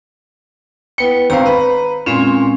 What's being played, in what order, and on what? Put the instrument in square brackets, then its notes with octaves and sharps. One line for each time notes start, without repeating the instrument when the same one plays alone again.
[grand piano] B3 C#7 [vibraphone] E4 B4 G5
[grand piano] G#1 C4 F5 [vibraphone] A#5
[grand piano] B4
[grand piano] A#2 [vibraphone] G#3 C4 C#4